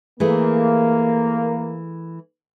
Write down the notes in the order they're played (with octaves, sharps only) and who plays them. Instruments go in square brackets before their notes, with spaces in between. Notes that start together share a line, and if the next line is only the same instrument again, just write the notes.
[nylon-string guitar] E3 A3 G#4 [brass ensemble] A#3